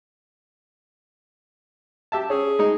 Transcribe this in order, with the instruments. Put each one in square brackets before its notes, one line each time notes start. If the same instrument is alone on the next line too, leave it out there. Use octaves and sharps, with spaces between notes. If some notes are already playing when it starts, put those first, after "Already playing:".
[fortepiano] G4 E5 A5
[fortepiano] C#4 [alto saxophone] G#4
[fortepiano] G#3 D#4